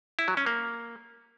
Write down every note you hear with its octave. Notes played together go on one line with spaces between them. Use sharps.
E4
F#3
C#4
A#3